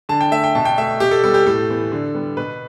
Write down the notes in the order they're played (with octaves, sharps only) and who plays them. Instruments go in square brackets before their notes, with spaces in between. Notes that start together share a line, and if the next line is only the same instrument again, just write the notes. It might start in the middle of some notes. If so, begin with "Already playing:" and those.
[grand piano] D3 A5
G5
A3 E5
G5
B2 A5
G5
A3 E5
B2 G4
A4
G3 B3 A4
G4
A2 A4
E3 B3
D3
G3 B3
B2 B4